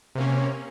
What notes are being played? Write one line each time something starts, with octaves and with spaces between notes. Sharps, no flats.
C3 A#3 C#4